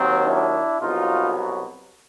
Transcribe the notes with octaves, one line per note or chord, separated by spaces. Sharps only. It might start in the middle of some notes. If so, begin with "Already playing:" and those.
Already playing: D#2 D#3 F#3 C4
D4 E4
C2 B2 F#3 D#4 F4